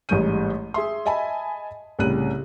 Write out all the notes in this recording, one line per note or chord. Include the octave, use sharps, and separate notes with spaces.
A1 G#2 G3 C#6 G6 D#7
G#4 E5 C6
D#5 E5 G#5 A5 B5
C2 A2 C#3 F#6 D#7